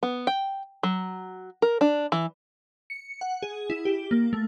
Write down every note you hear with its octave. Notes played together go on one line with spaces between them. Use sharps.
B3
G5
F#3
A#4
D4
E3
C#7
F#5
G#4
E4
G4
A#3
A3